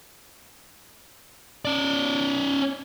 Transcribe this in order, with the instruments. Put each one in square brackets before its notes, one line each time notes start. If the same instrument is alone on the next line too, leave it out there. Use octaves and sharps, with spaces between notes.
[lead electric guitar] C#4 D5